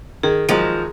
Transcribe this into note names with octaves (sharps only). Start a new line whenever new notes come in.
D#3 G#4
D#3 F3 F#3 G#3